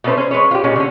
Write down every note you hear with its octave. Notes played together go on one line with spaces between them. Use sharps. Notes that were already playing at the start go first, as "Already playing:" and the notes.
B2 A3 B3 C#4 B4 C5
C#4 C5
G#3 B4 C#5
F4 G4
A#2 G#3 C#4
D3 C#4